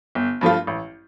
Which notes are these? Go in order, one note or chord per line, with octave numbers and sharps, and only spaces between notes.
G1
G2 F3 A3 F4
A1